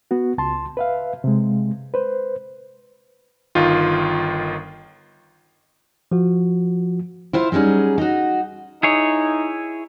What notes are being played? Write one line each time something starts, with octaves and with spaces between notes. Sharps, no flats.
B3 F#4
C#2 A5 C6
B4 E5 F5
C3 G#3
B4 C5
G1 D#3 F4
F3 F#4
E4 F4 C5
F#3 G3 C#4 D#4 G#4
D#4 F#4
D#4 E4 G#4 C#5